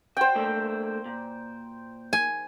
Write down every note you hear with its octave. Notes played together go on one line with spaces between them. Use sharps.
F#4 C5 G5
A3 A#3 D4
A#2
G#5